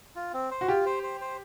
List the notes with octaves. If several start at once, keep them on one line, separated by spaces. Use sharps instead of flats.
F4
C4
C5
F#4
F4 G4
C5
C5
C5